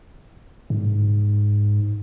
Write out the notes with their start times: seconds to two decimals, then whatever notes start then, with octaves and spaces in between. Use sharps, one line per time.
0.70 G#2